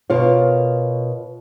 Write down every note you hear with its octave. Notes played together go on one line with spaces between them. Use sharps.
B2 F4 A#4 C#5